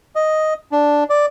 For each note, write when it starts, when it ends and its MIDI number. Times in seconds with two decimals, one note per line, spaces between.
0.15 0.54 75
0.72 1.04 62
1.09 1.26 74